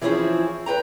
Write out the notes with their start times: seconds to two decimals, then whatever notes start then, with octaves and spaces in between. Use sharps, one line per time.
0.01 E3 F3 C4 C#4 E4 G#4
0.66 B4 C5 G5 A#5